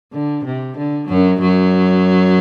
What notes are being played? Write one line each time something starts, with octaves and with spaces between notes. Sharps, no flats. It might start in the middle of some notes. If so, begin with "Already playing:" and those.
D3
C3
D3
F#2 F#3
F#2 F#3